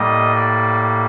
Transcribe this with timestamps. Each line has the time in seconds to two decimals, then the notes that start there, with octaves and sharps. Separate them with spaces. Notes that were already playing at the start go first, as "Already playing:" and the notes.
Already playing: A2 G3 A#3 D#5
0.36 D5